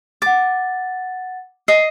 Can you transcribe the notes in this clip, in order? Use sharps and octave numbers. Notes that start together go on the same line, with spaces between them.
F#5 D6 A6
D#5 C7